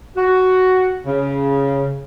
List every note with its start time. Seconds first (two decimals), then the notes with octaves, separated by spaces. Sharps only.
0.16 F#4
1.06 C#3